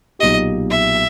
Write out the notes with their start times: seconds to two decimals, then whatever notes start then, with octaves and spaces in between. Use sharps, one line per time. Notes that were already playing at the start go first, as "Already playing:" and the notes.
0.19 B1 A#2 A#3 D#4 G4 D#5
0.70 E5